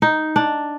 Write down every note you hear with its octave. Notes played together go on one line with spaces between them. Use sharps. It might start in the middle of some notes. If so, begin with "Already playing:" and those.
D#4
D4